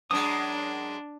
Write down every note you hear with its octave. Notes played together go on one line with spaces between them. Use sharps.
F#2 G#3 D4 D#6